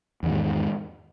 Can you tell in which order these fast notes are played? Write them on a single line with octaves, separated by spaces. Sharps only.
E2 D#3 G#2 G#3